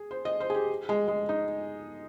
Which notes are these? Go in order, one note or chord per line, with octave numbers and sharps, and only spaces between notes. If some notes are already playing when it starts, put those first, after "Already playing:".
Already playing: G#4
C5
D#5
C5
G#4
G4
G#3
G#3
D#4